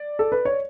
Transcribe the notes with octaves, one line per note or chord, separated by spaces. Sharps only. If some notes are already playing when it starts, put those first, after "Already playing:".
Already playing: D5
A4
B4
C#5